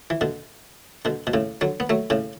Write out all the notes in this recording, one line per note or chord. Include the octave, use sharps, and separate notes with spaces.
E3
B2 D3
B2 D3
B2
A2 C#3
D3 F#3
B3
F#3 A3
A2 C#3